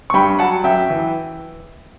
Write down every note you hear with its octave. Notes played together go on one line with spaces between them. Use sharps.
C#6
G2 G5 B5
F#3 F#5 A5
F#2 E5 G5
E3